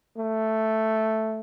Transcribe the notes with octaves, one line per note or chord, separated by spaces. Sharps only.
A3